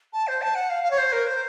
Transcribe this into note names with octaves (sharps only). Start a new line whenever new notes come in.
A5
C5
A5
F#5
F5
F5
C#5
C5
A#4
C5